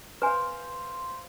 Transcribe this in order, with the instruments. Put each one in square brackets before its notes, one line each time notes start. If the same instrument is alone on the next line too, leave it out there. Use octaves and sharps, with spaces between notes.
[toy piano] B4 G#5 [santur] C5 F5